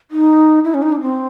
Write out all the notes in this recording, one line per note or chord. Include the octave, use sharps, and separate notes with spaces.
D#4
E4
C#4
D#4
D4
C4